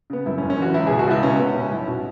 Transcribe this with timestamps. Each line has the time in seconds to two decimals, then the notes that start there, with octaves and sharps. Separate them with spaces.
0.10 C#3 B3
0.26 F#2 E4
0.38 C#4
0.42 F#1
0.50 C#4
0.58 E3 F#4
0.74 C#2 E4
0.87 B2 G#4
0.99 F#4
1.07 C#2 E4
1.23 B2 C#4
1.39 C#2 B3
1.55 B2 C#4
1.71 B1 E4
1.88 B2 F#4